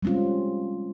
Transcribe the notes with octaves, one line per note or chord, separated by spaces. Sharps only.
G3 G#3 C4 C#4 F4